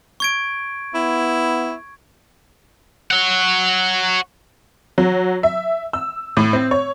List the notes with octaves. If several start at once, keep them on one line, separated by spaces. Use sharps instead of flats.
C#6 G#6 D7
B3 E4
C#5 F#5
F#3
E5
E6
A2
C4
C#5